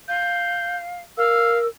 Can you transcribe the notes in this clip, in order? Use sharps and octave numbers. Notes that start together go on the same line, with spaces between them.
F5 G6
A#4 F5 E6